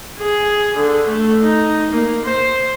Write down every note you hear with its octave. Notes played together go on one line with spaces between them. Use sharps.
G#4
D3
A3
D#4
A#3
C5